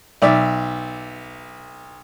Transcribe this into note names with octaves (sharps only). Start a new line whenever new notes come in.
B1 D5 E5